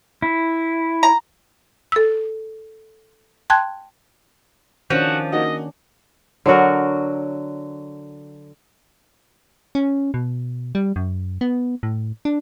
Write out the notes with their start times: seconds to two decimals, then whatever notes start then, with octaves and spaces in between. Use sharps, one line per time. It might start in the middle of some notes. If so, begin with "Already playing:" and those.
0.22 E4
1.03 A#5
1.92 A4 E6
3.50 G5 A5 C6 F#6 G#6
4.90 D#3 F3 C#4 D4 F#4
5.32 A#3 D#4 F#4 D#5
6.46 D3 F#3 F#4 A#4
9.75 C#4
10.14 B2
10.75 G3
10.96 F#2
11.41 B3
11.83 A2
12.25 D4